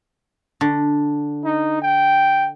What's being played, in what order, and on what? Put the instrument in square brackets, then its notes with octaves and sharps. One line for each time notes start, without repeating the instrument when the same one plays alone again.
[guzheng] D3
[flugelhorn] D#4
G5